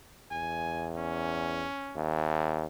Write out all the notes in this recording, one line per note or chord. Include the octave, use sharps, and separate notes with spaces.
E2 G#5
C#4
D#2